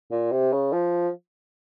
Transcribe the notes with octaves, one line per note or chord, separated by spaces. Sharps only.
A#2
C3
C#3
F3